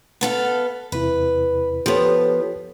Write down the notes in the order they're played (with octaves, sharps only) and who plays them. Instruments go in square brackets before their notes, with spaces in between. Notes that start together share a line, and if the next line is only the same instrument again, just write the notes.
[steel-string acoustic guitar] B3 A4 F5
[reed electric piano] E2 C3 E4 [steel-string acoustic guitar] B4
[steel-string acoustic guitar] F3 B3 [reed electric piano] G4 A4 C#5